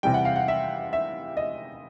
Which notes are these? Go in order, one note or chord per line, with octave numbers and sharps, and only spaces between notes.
C3 E3 G3 G5
F#5
F5
F#5
E5
E5
D#5